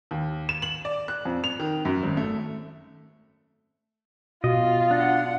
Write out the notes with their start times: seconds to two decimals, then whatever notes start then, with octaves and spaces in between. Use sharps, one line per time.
0.11 D#2
0.49 E7
0.62 F#7
0.85 D5
1.08 F#6
1.25 F2
1.44 F7
1.60 D#3
1.85 F#2
2.03 G#1
2.17 A3
4.44 B2 F4 D#5
4.91 D4 F#5